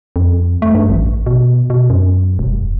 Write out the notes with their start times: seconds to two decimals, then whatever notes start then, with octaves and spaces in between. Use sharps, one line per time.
0.16 F2
0.62 A3
0.75 G2
0.89 A1
1.26 B2
1.70 B2
1.90 F#2
2.39 E1